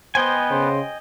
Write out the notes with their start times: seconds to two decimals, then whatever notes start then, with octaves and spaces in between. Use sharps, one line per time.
0.15 B3 C5 D#5 G5 G#5
0.50 C#3 C5